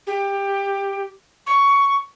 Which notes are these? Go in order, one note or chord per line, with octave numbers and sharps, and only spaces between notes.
G4
C#6